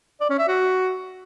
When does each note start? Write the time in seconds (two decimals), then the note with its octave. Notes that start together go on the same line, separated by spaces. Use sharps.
0.21 D5
0.30 C#4
0.39 E5
0.48 F#4